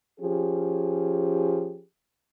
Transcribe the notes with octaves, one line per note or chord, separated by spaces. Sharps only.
F3 C#4 G4 G#4